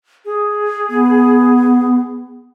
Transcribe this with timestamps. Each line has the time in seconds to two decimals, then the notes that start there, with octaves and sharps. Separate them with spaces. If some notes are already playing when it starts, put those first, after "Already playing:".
0.25 G#4
0.90 B3